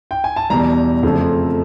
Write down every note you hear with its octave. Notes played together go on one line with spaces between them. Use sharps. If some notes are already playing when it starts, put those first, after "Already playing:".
G5
G#5
A5
E2 B2 G3 A#5
F2 C#3 F3 A3